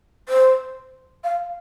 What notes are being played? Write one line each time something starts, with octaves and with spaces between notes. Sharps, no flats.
C5
F5